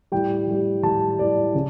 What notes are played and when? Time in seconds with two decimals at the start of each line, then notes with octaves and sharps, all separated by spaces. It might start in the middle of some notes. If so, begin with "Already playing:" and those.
0.12 A2 G3 G5
0.47 A2 G3
0.83 A2 G3 A5
1.19 A2 G3 D5
1.54 C#3